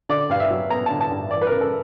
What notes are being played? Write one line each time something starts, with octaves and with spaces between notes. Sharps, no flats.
D3 D5
G2 F5
E5
F#3
B3 A#5
D3 A5
A5
G2
E3 D5
B4
C#3 A#4
A4